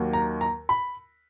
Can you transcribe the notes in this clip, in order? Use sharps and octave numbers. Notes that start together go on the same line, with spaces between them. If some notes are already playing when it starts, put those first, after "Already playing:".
Already playing: D#2 D#3 F#3 A#3
A#5
A#5
B5